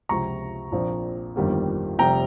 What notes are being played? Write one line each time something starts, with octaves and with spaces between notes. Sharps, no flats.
C#2 C3 F3 C4 A#5 C#6
A#1 A#2 F3 C4
G1 F2 D#3 G3 A#3
F1 F2 C3 G3 G5 A#5